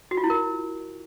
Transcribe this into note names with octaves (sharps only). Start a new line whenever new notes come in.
F#4
F4
E4
A#4